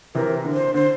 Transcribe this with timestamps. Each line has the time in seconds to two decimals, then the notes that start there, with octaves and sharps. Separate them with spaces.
0.15 C3 E3 A#4
0.45 D3
0.54 C5
0.74 D3 C5